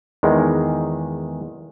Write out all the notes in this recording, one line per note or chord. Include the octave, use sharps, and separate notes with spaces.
E2 D#3 G#3